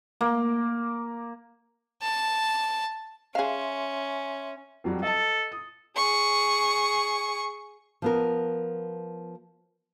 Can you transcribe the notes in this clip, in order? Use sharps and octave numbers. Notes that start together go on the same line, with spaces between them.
A#3
A5
C#4 G#4 E5 F5 C6
F2 F#3 G3
A4 D#5 A5
D#6
G#4 C#6
F3 B3 A#4